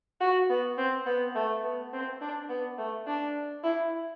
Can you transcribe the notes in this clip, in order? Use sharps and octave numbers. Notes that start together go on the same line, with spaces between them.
F#4
B3
C4
B3
A3
B3
C4
D4
B3
A3
D4
E4